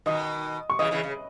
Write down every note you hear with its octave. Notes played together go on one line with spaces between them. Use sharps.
B2 D#3 D#5 D#6
C#6
C#3 E3 D#5 D#6
C#3 E3
C#3